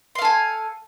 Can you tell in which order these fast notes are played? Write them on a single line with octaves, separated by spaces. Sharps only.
C6 F5 A4 G#5